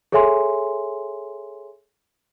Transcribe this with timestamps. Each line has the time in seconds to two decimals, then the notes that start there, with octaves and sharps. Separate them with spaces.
0.12 G#4 A4 C#5 E5 G#5 C6